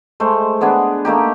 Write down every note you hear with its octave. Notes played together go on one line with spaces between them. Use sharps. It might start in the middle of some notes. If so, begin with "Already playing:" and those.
G#3 A3 C5
G#3 B3 D4 G#4
A3 A#3 D#4 G4